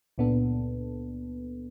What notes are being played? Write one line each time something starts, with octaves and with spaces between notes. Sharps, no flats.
C#2 A#2 B3 D4 A4